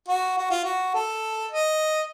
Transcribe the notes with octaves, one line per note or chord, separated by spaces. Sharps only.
F#4
F#4
F4
F#4
A4
D#5